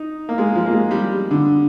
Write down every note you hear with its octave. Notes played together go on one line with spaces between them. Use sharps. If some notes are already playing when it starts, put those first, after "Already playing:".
Already playing: D#4
A#3
G#3
F3
A#3
G#3
G3
D3